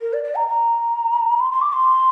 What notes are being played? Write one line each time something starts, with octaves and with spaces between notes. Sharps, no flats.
A#4
D5
D5
A#5
A#5
C6
C6
D6
C6